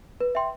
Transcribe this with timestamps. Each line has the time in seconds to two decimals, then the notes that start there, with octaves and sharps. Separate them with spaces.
0.20 B4
0.35 E5 G5 C6